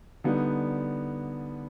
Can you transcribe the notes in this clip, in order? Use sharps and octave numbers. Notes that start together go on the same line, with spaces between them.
D3 G3 B3 D#4